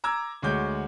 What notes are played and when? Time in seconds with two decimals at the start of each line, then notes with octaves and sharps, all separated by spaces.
0.04 A#5 D6 E6 G#6
0.42 D2 G#3 F#4 C#5 D6 G6